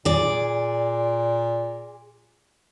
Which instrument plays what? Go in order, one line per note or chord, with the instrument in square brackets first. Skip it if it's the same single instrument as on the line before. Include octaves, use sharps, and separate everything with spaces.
[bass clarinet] A#2 [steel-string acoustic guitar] G#4 D5